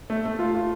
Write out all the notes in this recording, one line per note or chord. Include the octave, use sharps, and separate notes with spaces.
A3
A3
F4
F4